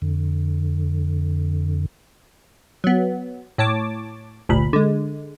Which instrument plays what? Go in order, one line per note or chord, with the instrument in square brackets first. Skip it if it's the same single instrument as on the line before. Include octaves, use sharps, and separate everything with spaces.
[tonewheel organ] F2 D3
[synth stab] F#3 B3
A2 C#5 A5 D6
G1 D2 A#2 B5
D3 G#3